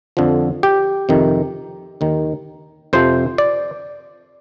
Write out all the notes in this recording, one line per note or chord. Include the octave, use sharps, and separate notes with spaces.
F2 D3 F3
G4
F2 C3 D#3
D#2 D#3
F2 C3 F3 C5
D5